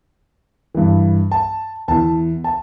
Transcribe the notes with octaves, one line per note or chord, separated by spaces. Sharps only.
G2 E3
A5
E2 E3 A5
A5